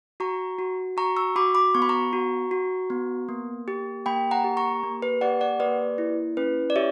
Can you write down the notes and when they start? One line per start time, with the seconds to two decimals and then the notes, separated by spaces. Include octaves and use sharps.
0.20 F#4 A#5 C#6
0.59 F#4
0.97 F#4 A#5 C#6
1.17 C#6 E6
1.36 F#4 B5 D6
1.55 B5 D6
1.75 B3 C#6
1.82 B5
1.89 A#5 C#6
2.13 F#4
2.51 F#4
2.90 B3
3.29 A#3
3.68 G4
4.06 A#3 G5 B5
4.31 F#5 A#5
4.44 G4
4.57 A#5 C#6
4.83 A#3
5.02 B4
5.21 G4 D5 F#5
5.41 D5 F#5
5.60 A#3 B4 D5
5.98 E4
6.37 C#4 B4
6.70 D5
6.76 G4 C#5 E5